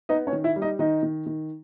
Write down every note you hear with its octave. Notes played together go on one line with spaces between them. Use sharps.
B3 D#4 D#5
C#4 C#5
D#3
E4 E5
G3
D#4 D#5
D#3 D#4 D#5
D#3
D#3